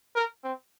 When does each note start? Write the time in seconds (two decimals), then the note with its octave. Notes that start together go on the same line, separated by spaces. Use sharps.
0.15 A#4
0.44 C4